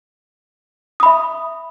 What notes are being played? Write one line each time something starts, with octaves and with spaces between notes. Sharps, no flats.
E5 B5 D#6